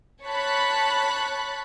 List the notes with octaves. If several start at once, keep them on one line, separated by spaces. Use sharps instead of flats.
C#5 A5 B5 F#6